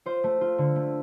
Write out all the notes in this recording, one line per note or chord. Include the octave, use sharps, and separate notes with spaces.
F4 C5
A3
F4
D3
A3